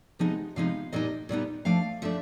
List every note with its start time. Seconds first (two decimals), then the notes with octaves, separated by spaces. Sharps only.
0.19 C3 F3 G#3 B3 D#4 F#5
0.56 C3 F3 G#3 B3 D#4 F5
0.93 A#2 G3 B3 D#4 D#5
1.29 A#2 G3 B3 D#4
1.65 F3 A3 D4 F5
2.02 F3 A3 D4 E5